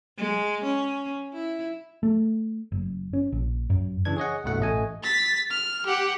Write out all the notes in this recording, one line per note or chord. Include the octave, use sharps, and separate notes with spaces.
G#3
C#4
E4
A3
F#1
C#4
A#1
F#2
C#3 E3 D4 G#6
G#4 C#5 D#5 F#5
C2 G2 B2 A3 F#5
A1 A3 D#5 G#5
A6 B6
F6
G4 F#5